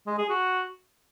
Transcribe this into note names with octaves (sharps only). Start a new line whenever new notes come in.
G#3
G#4
F#4